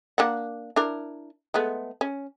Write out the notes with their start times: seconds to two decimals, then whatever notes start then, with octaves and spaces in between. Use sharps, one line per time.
0.18 A#3 D4 F#5
0.76 D4 E4 A#4
1.54 G#3 A3 B3
2.01 C#4